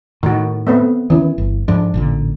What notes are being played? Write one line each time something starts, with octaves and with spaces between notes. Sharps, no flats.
A2 D#3 F#4
A3 B3 C4
D#3 E3 C#4
G1
G#2 F3 D4
A1 A#2 D3